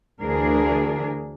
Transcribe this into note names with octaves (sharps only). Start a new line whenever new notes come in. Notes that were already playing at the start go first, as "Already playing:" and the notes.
D2 D3 E3 D4 G#4 A#4